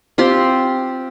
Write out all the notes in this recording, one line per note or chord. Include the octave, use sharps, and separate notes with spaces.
C4 F4 G4 C6